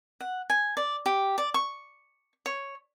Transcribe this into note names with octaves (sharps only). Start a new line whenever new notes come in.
F#5
G#5
D5
G4
D5
C#6
C#5